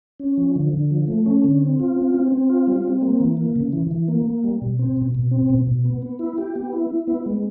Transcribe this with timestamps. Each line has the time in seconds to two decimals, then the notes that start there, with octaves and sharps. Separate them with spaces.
0.20 C#4
0.37 F3
0.56 D3
0.73 D3
0.91 F3
1.08 A3
1.26 C#4
1.44 D3
1.61 C4
1.79 F4
1.96 C4
2.14 C4
2.32 C4
2.49 F4
2.67 G3
2.84 C4
3.02 A#3
3.20 E3
3.37 A#3
3.56 C#3
3.73 E3
3.91 E3
4.08 A#3
4.26 A#3
4.44 G3
4.62 B2
4.79 C4
4.97 B2
5.15 B2
5.31 C4
5.50 B2
5.67 B2
5.85 B3
6.02 B3
6.19 E4
6.38 G4
6.56 B3
6.73 E4
6.90 E4
7.07 B3
7.26 G#3